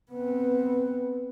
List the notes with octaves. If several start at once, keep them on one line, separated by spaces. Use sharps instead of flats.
B3 C4 B4